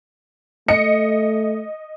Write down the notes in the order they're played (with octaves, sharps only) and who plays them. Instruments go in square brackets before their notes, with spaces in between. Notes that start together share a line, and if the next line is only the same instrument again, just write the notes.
[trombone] A3 [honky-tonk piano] D#5 C#7